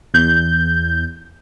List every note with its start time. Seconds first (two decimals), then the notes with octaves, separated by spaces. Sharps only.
0.14 E2 G6